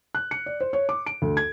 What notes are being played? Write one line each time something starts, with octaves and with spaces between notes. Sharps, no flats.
F#6
C#7
D5
C5
C#5
D6
D7
D2
G#6